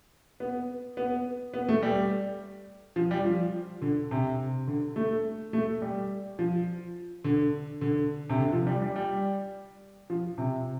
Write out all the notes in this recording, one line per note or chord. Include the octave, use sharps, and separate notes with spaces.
B3
B3
B3
A3
G3
F3
G3
F3
D3
C3
D3
A3
A3
G3
F3
D3
D3
C3
D3
F3
G3
G3
G3
F3
C3